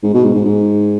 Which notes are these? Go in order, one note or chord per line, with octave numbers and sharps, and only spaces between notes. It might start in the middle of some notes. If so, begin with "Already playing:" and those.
G#2
B2
G#2
G#2
G#2